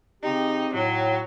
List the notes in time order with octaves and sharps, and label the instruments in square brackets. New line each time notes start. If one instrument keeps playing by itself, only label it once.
[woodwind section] C#3 C4 G4 [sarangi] D#4
[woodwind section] A2 [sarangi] F#3